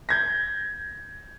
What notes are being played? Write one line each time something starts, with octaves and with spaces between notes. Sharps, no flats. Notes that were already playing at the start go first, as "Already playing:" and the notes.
G6 G#6 A#6